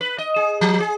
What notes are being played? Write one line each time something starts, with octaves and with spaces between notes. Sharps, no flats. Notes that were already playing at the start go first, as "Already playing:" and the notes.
B4
D#5
G#4
F3
G#4